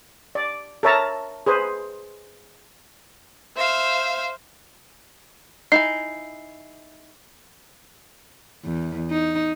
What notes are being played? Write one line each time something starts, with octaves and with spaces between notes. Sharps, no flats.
D5
A4 A#4 C#5 E5 A5 A#5
G#4 B4 C5
C5 E5 F5
D#4 E4 G#5 C7
E2
D#4